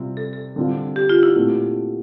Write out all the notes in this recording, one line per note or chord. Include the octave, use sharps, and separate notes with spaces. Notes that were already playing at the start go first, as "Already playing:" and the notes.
Already playing: C3 G3 C4 F4
A4
A4
D3 G3 C4 F4
G4
F4
E4
A#2 A3 C4